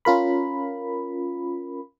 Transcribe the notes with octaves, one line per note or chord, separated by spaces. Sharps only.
C#4 F4 A#4 B5